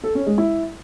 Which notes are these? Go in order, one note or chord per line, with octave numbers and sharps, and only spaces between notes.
A4
C#4
G#3
E4